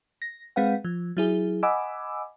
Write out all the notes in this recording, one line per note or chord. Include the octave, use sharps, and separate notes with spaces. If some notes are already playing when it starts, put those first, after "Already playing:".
A#6
G#3 C4 B4 F5 F#5
F3
F#3 E4 G#4
D#5 F#5 G#5 B5 D6 E6